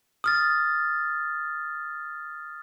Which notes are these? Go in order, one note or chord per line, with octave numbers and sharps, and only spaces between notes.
D#6 F6 A6